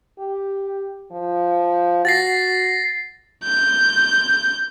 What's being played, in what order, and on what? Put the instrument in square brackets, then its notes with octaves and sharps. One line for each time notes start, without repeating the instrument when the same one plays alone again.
[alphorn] G4
F3
[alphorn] F#4 [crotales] A6 A#6 C7
[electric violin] G6